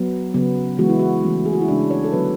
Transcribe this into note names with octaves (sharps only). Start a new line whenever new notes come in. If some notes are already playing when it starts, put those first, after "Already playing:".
Already playing: F#3 B3
C#3 F#3 B3
E3 G#3 B3 F#4
E4
F#4
E3 A3 C#4
G#4
F#4
E4
C#3 G#3 C#4 D4
C#5
A4
D3 F#3 B3 B4